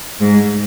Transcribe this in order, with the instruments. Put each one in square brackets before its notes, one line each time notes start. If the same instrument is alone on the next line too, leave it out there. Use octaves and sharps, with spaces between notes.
[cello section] G#2